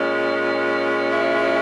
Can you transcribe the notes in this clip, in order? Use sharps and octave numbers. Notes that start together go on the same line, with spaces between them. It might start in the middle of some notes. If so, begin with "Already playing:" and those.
Already playing: A#2 G#3 C#4
E4